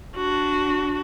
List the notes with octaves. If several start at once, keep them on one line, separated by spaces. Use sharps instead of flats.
D4 F#4